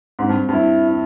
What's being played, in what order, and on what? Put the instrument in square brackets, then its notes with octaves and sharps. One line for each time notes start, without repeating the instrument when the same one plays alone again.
[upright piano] G#2 [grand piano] C4
[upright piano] G2
[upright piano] G2 [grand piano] E4
[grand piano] E4